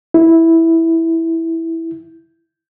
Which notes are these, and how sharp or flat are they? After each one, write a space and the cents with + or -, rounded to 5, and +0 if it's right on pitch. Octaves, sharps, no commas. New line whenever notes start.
E4 -5